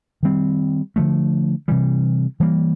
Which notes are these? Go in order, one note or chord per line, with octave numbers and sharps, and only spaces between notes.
D#3 G3 C4
D3 F3 A3
C3 E3 G3
E3 G3 A#3